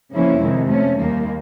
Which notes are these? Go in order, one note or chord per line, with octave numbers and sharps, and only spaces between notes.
C#3 F3 A#3 C#4 E4
F2 C3 D#3 G#3
F3 A3 C#4
D#2 D#3 G3 A#3